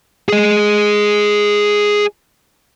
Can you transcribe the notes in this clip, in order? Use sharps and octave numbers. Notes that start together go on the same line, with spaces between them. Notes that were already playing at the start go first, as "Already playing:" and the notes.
G#4 D#5